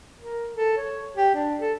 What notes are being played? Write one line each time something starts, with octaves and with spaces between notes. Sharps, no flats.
A#4
A4
C#5
G4
D4
A4